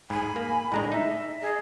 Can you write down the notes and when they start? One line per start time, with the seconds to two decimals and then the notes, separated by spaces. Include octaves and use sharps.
0.10 G#2 G#5 B5
0.36 A#3
0.72 A2 G#3 D4 D#5 A#5
0.92 D#4 E5
1.42 G#4 D#5